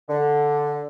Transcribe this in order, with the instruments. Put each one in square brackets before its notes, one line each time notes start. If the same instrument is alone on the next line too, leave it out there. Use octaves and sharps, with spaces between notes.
[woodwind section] D3